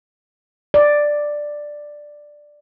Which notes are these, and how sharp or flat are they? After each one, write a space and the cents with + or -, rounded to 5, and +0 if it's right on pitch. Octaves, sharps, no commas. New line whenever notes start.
D5 +5